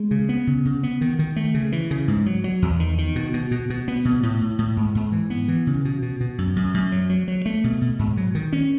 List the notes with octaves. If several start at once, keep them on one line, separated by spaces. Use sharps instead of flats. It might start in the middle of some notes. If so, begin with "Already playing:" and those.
Already playing: G#3
C#3
B3
C#3
C#3
B3
D#3
D#3
A3
C#3
E3
C#3
G#2
F#3
F#3
E2
D#3
D#3
B2
B2
B2
B2
B3
B2
A2
A2
A2
G#2
G#2
E3
B3
E3
C#3
B2
B2
B2
F#2
F#2
F#2
F#3
F#3
F#3
A3
B2
B2
G#2
F#3
D#3
C#4